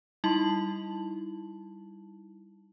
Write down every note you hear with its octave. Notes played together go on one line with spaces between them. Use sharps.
G3 D#4 E4 A5 F#7